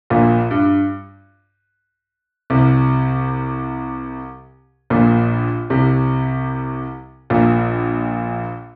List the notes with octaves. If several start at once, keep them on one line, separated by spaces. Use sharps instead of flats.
A#1 A#2
G2
C2 C3
A#1 A#2
C2 C3
A#1 A#2